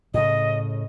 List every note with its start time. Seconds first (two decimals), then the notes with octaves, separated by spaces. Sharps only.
0.14 A2 C#3 D#5